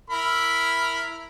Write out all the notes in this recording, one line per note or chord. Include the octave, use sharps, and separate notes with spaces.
E4 A#4 B5